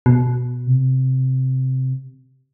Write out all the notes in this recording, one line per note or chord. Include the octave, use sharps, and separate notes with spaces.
B2
C3